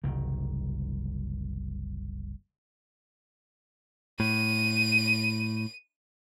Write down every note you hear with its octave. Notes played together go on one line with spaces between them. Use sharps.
F#1 C2 D#3
A2 D#7